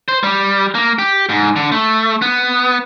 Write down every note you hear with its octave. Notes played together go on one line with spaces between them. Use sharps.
C5
G3
A#3
G4
G#2
D3
A3
B3